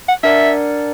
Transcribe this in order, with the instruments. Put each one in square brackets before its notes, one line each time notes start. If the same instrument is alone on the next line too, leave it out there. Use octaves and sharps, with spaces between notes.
[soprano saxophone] F#5
[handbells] D4 A#4 D5 F#5 [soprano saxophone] E5